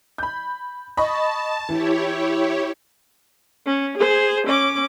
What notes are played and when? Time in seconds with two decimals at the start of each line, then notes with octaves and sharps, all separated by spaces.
0.18 B5 G6
0.97 D#5 A5 B5 C#6
1.69 E3 E4 G4 C#5
3.66 C#4
3.98 G#4 C5
4.47 C#4 D6